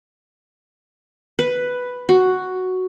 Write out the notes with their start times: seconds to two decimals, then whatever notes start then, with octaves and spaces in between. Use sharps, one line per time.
1.39 B4
2.09 F#4